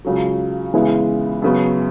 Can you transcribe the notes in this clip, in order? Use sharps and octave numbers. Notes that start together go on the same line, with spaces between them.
C#2 C#3 F#3
C#3 E3 G#3 B3 E4
F#2 C#3 F#3 B3